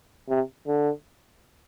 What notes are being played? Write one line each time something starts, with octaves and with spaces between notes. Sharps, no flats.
C3
D3